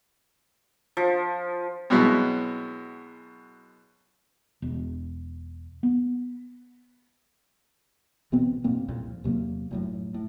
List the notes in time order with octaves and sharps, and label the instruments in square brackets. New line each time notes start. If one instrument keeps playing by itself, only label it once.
[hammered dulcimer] F3
[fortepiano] F#2 B2 G#3 B3 C4 E4
[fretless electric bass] E1
B3
[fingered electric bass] A1 B2 B3 C4
F#2 B2 A#3 C4
C2 F2 A#2
E2 C3 F#3 A#3
F1 F#2 A2
A2